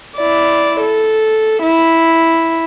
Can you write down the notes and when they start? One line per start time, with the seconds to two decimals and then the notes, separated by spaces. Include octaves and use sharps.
0.17 E4 D5
0.81 A4
1.62 E4